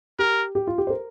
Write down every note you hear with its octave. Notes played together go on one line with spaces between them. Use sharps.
G4 A#4
G4
F4
G4
C5
A#4